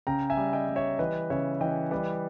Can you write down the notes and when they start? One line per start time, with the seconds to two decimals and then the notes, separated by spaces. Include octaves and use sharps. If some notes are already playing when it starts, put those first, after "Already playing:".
0.07 C#3 G5 A#5
0.30 E5 G#5
0.37 G3
0.53 D#5 G5
0.68 G3
0.76 C#5 E5
0.99 E3 B4 D#5
1.30 C#3 C#5 E5
1.61 E3 D#5 G5
1.91 G3 B4 D#5